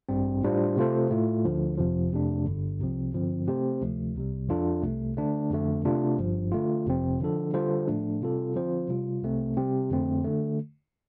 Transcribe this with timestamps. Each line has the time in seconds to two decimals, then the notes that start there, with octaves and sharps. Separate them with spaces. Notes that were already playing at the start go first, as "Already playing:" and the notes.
0.09 A1 G2 G3 C4
0.42 A2 G3 D4 F4 C5
0.76 C3 A3 F4 A4 C5
1.10 A2 A3 F4
1.45 D2 D3 F3
1.78 G1 F2 C3 F3
2.12 F2 C3 A3 D4
2.46 G1 G2 D3
2.80 C2 C3 F3 C4
3.13 G2 D3 F3 C4
3.47 C3 A3 C4 G4 C5
3.81 D2 C3 F3 A3
4.15 C2 C3 G3
4.48 F2 F3 D4 F4 A4
4.82 C2 C3 A3
5.17 D3 A3 D4
5.51 F2 D3 A3
5.85 C3 A3 D4 F4
6.18 G1 G2 F3
6.52 D3 A3 F4
6.86 G1 F2 C3 F3 C4
7.20 D3 F3 D4 A4
7.53 D3 G3 F4 A4 C5
7.87 A2 F3 A3 D4
8.21 C3 G3 C4 F4 A4
8.55 D3 F3 C4 F4 C5
8.88 C3 G3 F4
9.22 C2 C3 A3 C4
9.57 C3 G3 C4 G4
9.90 F2 D3 A3 C4
10.24 D3 A3